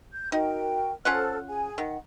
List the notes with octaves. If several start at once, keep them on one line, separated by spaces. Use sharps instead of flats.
G6
D#4 F#4 A#4 G5
C#4 F4 A4 C5 F#5 F6
G#4 G#5
D#3 F#5